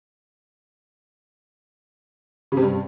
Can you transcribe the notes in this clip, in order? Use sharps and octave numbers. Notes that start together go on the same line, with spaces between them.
C#3
C3
G2